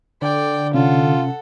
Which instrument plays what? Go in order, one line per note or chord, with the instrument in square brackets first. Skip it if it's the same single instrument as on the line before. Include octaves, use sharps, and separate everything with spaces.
[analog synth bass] D3 [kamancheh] D5 G5
[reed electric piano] C3 C#4 [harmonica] F4 [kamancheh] A4 F#5